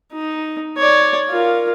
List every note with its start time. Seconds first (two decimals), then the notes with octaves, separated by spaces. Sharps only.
0.13 D#4
0.78 C#5 D5
1.30 F4 A#4